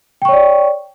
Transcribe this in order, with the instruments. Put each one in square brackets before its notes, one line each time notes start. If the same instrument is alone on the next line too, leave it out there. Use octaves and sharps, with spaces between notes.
[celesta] G5
C#6
C#5
D5